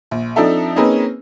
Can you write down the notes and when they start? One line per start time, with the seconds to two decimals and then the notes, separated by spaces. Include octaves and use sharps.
0.11 A#1
0.36 F3 C4 D4 D#4 A4 E5
0.76 A#3 C4 C#4 D#4 G#4 B4